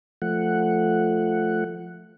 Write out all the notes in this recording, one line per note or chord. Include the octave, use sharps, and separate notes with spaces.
F3 A3 F#5